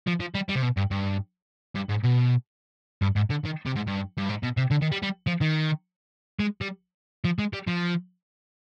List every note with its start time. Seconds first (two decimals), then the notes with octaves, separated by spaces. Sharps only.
0.07 F3
0.20 F3
0.35 G3
0.49 G3
0.56 C3
0.63 B2
0.77 G2
0.91 G2
1.75 G2
1.89 G#2
2.03 B2
3.02 G2
3.16 G#2
3.30 D3
3.45 D#3
3.66 C3
3.76 G#2
3.87 G2
4.17 G2
4.29 G#2
4.43 B2
4.57 C3
4.71 D3
4.82 D#3
4.92 G3
5.03 G3
5.27 F3
5.41 D#3
6.39 G#3
6.61 G3
7.25 F3
7.39 G#3
7.53 G3
7.67 F3